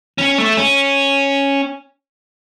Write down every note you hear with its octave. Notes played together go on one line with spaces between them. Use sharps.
C#4
A3
C#4